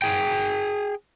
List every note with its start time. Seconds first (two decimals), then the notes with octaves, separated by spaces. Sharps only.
0.02 G#4 G5